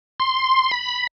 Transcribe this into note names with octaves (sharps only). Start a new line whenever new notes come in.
C6
B5